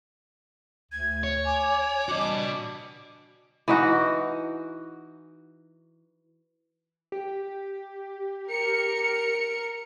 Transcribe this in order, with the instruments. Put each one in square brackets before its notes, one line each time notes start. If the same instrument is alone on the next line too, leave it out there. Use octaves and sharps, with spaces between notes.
[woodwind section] D2 [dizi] G#6
[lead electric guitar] C#5
[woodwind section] G#5 [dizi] D6
[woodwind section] E3 G3 D4 [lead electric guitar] F#4 D#5
[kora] E3 D#4 F#4
[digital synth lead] G4
[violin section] A#4 C#7